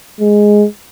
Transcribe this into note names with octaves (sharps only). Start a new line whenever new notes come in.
G#3